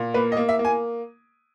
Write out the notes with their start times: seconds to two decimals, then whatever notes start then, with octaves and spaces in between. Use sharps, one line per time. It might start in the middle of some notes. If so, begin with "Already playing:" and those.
Already playing: A#2
0.14 A#3 B4
0.32 D#5
0.37 A#3
0.49 E5
0.59 A#3
0.65 G#5